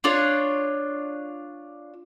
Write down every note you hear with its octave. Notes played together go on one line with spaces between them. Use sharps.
D4 F4 C#5